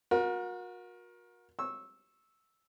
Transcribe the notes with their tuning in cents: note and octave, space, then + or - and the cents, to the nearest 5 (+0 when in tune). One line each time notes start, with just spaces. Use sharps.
F#4 -35 A#4 +25
C#6 -25 E6 -10